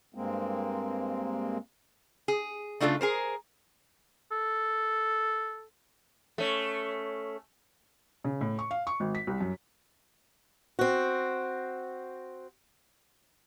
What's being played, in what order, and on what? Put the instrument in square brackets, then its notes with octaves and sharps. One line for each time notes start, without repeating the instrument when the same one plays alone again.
[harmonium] G2 G#3 A#3 C4
[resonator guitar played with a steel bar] G#4
C#3 A3 D4 F4 G#4 A4
G#4 A#4 C5
[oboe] A4
[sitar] A3 C#4
[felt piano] C#3
A2
C#6
F5
C#6
G#1
B6
C2
F#2
[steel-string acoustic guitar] C4 F#4